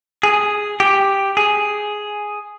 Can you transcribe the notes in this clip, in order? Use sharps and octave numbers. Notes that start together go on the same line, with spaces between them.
G#4
G4
G#4